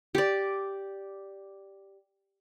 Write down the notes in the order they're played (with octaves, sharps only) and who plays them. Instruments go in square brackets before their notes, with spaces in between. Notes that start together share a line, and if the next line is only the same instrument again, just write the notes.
[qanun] G4 D5